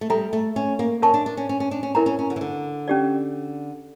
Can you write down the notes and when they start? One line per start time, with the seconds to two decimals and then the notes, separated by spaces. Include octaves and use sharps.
0.01 A3
0.10 G3 A4 E5 A#5
0.33 A3
0.56 C#4
0.79 A#3
1.02 C#4 A#4 E5 A5 C#6
1.14 D4
1.26 D4
1.37 C#4
1.49 C#4
1.60 C#4
1.71 D4
1.83 C#4
1.95 C#4 E4 A#4 E5 A#5
2.06 C#4
2.19 C#4
2.30 D3
2.36 E3
2.41 D3
2.88 C#4 G4 D5